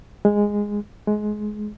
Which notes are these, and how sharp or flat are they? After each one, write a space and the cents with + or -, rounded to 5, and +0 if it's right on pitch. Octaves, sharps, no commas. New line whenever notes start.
G#3 -10
G#3 +20